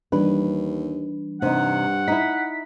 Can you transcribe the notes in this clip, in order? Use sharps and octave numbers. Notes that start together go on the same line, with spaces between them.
D#2 E3 G3 D4 B4
G2 C3 D#4 F#5
D#4 E4 B6